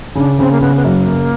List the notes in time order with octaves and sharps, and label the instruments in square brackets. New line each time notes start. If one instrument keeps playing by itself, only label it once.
[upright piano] C#3 [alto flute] D4
[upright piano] C#3 [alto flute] C4
[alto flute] A#3
[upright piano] C#3 [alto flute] B3
[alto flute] B3
[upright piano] F#2 [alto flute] A#3
[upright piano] C#3